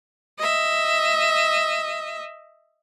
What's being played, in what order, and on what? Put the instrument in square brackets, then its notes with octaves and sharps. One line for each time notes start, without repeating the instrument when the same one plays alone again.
[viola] D#5 E5